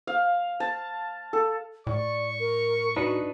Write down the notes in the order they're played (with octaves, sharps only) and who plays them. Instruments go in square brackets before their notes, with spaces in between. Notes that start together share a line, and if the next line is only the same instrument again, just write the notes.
[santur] F5
A5
A4
[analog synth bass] A2 [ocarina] D5 [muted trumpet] C#6
[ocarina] A#4
[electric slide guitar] D4 D#4 B4 [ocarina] F#4